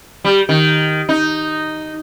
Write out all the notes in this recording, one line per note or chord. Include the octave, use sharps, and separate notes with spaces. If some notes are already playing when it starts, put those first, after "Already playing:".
G3
D#3
D#4